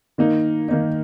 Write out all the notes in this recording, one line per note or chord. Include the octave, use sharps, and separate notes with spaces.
D#3 A#3 D#4
D#3 A#3 D#4